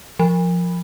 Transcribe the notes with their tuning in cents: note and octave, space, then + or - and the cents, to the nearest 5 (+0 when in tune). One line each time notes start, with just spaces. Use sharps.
F3 +0 B5 +0